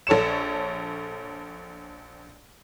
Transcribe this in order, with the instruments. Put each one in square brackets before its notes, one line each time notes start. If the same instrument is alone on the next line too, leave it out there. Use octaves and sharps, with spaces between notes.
[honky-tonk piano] A#1 A4 C#5 C#7 E7